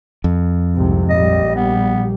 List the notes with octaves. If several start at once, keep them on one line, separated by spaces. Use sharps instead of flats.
F2
C2 G#2 C3
A#1 G3 D#5
B3